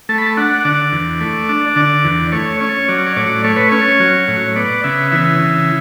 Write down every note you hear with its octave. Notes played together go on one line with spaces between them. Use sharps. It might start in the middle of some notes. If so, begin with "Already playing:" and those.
A3 A5
B5
A5
D4 F#5
D3 D5
E2
A3
D4
D3 D5
E2
A3 C#5
C#4 C#5
F#3 D5
C#5
A2 D5
A3 C#5
B4
C#4 C#5
F#3
A2
B3 D5
C#3 E5
E3 E5
C#3